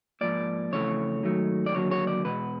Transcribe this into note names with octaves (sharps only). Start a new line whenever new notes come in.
G#2 F3 A#3 D5
F2 C#3 E3 A3 C#5
G#2 D#3 F#3 A3
D5
D#2 D3 F#3 A#3 C#5
C#5
D5
E2 B2 G#3 B3 B4